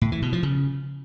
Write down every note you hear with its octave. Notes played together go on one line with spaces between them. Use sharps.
A2
E3
B2
F3
C#3